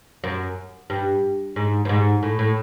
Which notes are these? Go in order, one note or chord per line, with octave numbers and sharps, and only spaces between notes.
F#2
G2
G#2
G2
G#2
A2
A2